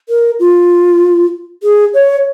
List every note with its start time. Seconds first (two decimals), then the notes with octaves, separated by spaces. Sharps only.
0.09 A#4
0.39 F4
1.63 G#4
1.94 C#5